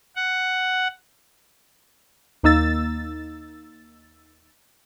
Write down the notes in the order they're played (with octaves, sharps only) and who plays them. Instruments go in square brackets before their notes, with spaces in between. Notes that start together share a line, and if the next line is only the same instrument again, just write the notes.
[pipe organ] F#5
[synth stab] D#2 A#3 D#4 E6 A6